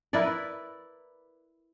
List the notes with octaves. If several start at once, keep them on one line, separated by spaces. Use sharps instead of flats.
E4 A#4 B4 D5